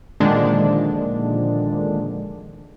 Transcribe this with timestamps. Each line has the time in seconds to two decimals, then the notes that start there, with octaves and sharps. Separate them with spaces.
0.20 A#2 D3 D#3 F3 G#3 D4